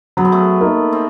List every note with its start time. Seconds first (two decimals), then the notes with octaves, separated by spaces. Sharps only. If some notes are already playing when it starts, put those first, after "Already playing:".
0.17 F#3 B3
0.25 C4
0.32 A3 B3
0.61 A#3 D#4
0.93 C4